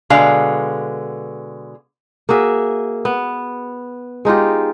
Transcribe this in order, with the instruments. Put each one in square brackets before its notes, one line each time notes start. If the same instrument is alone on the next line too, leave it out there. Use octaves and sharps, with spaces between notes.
[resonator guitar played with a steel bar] B2 D3 G#3 F5
[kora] A#3 F#4 G#4 E5
B3
G#3 D#4 F4 G4